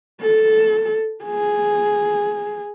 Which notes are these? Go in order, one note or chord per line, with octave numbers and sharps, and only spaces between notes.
A4
G#4